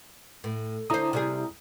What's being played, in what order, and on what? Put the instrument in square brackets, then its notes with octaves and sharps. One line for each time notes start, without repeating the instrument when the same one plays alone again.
[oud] A2
[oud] D3 C5 [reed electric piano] E4 A#5 D#6
[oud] C3 G3 G#4